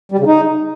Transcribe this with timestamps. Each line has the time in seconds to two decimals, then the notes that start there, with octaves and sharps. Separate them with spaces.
0.12 G3
0.19 C#3
0.26 D#4